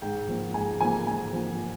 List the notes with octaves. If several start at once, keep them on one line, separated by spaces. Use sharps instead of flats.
G#2 G5
F3 A#3
G#2 G#5
F3 A#3 G#5
G#2 G#5
F3 A#3